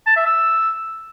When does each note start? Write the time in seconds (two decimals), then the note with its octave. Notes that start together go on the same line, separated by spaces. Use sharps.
0.07 A5
0.16 E5
0.26 E6